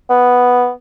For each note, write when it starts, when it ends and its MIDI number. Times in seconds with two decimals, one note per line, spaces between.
0.10 0.71 59